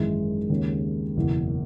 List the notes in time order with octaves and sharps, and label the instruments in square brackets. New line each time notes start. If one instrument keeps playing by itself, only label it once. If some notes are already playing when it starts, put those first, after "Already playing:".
Already playing: [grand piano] G#1 F#2 E3 G#3
D#2 C#3 G#3
F#1 E2 B2